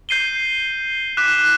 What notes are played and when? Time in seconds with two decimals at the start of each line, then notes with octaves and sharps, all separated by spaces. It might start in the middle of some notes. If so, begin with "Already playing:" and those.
0.09 G6 C7 D#7 G7
1.17 D6 F#6 B6 E7